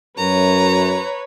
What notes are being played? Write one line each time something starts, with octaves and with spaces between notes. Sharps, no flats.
F#2 B4 C#5 A#5